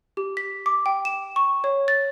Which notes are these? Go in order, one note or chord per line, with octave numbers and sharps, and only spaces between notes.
G4
B6
D6
G5
E7
C#6
C#5
A6